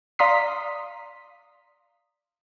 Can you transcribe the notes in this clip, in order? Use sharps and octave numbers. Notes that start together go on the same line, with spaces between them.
D5 F5 A#5 C6 D#6 B6